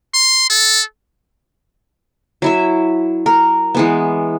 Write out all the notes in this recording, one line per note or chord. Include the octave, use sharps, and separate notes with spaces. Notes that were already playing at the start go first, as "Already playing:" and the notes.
C6
A4
F#3 E4 E5
A#4
E3 G#3 B3